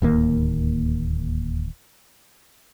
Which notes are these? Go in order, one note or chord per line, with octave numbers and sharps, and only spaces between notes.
D1 D#2 A#3